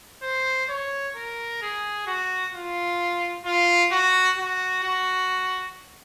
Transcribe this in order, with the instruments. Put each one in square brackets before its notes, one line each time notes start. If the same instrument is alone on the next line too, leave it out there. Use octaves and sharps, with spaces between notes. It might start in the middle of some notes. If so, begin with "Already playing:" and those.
[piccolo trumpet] C5
C#5
A#4
G#4
F#4
F4
F4
F#4
F#4
F#4